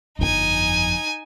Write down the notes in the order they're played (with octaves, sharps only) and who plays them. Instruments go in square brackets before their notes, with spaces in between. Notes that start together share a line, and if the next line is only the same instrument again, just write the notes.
[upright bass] G1 F2 [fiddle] D#4 G#5